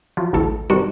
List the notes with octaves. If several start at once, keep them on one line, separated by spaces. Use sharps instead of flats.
F3 F#3
A1 D2 A3 A4
G2 C3 D#3 G3 F#4